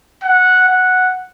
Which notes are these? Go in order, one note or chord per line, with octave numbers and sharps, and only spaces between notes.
F#5
F#5